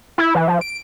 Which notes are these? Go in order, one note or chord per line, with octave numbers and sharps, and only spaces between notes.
E4
E3
F3
D7